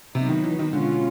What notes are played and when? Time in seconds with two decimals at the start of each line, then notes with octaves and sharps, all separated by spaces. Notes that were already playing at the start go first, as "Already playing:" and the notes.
0.14 C3 F#3 B3 D#4
0.29 D#3
0.44 E3
0.59 D#3
0.73 B2 D3 G#3 C#4 F4